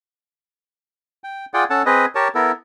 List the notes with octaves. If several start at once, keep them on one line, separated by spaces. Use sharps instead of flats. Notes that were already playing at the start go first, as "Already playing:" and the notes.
G5
F4 G#4 D5 F#5 G5
C#4 A4 F#5 A5
C4 G#4 B4 D#5
G4 A#4 C#5 A5
B3 E4 A4 A#4